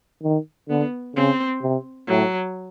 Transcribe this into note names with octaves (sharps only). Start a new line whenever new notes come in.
D#3
D3 B3
C#3 C4
C3
A2 F#3